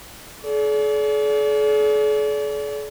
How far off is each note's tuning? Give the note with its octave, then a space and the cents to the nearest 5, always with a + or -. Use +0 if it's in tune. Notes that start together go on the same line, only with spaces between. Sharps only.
G#4 +45 D5 -35